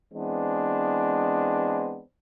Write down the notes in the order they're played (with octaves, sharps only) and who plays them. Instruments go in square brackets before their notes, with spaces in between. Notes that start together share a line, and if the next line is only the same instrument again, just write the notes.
[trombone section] E3 G#3 B3 C4 D4